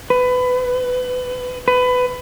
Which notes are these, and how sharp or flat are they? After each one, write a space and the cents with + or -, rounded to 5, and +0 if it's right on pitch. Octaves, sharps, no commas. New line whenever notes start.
B4 +25
B4 +20